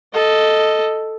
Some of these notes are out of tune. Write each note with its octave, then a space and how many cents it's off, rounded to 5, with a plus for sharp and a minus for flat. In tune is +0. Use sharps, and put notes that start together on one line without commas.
A4 +0 D#5 +0